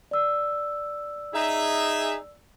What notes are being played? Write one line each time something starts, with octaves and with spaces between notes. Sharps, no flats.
D5 E6
D#4 G#4 E5